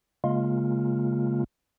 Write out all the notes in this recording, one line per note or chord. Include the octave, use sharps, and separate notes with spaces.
C#3 G#3 A#3 F4